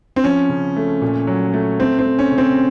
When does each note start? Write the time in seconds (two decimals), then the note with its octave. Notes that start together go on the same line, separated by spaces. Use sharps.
0.16 C4
0.24 F3 C#4
0.50 C#3
0.77 A3
1.01 A#2
1.27 F#3
1.54 A3
1.80 A3 C4
1.99 C4
2.05 A3
2.19 C#4
2.32 C#3
2.38 C4